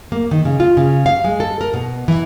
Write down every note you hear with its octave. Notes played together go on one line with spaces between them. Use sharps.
A#3
D#3
C#3
F4
C#3
F5
G#3
A4
A#4
B2
E3